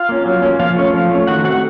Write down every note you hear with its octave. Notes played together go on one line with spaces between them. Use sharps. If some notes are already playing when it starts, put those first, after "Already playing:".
Already playing: F4 F5
A#3 C#4
F#3
A#3 C#4
F3 F4 F5
A3 C#4
F3
A3 C#4
D#3 F#4 F#5
A3 C4 F#4 F#5